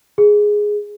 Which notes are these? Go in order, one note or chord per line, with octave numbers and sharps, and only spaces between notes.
G#4